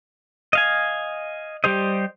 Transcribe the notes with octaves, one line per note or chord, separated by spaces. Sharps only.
D#5 F5 G#5
G3 G4 C5 D#5